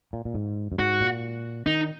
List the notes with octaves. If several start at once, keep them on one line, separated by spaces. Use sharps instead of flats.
A#2
A#2
G#2
F#2
G#2 F#4
A#2
D#3 D#4